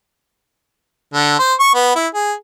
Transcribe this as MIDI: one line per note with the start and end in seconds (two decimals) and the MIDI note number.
1.14 1.39 50
1.39 1.53 72
1.60 1.70 85
1.74 1.93 59
1.96 2.07 64
2.14 2.33 68